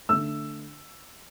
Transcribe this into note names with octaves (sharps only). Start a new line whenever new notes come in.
D3 A3 E6